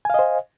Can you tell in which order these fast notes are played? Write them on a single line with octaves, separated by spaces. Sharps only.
G#5 F5 D#5 C5